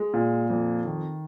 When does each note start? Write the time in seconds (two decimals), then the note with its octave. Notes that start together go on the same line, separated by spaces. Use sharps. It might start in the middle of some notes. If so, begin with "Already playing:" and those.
Already playing: G#3
0.14 A#2
0.50 F2
0.85 D#3